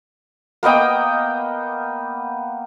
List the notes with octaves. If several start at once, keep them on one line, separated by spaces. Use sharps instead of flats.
A#3 B3 D#5 G5